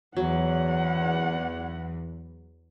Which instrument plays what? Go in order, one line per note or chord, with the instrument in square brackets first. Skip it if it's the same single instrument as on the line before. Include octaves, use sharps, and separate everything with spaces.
[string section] E2 [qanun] F#3 [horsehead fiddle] F#5